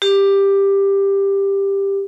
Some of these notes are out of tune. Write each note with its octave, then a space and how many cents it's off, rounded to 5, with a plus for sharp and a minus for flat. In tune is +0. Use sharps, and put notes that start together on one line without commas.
G4 +10